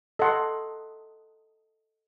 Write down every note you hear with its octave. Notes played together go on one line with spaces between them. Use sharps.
A4 D#5 F#5 C6